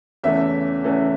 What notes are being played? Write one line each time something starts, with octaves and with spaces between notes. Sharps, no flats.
E2 C#3 E3 A3 C#4 E5
E2 C#3 E3 A3 C#4